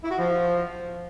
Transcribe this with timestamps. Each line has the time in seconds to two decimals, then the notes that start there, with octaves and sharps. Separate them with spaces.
0.04 E4
0.11 F#4
0.18 F3